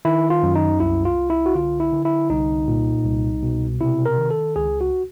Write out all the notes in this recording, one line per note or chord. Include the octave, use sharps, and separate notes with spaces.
D#3 E4
F4
F#2
D#4
C2 E4
F4
C2
E4
F#4
D3 F4
E4
D3
E4
C2 D#4
A#2
C2
B2
C3 E4
A#4
D#3
A4
C#2 G#4
F#4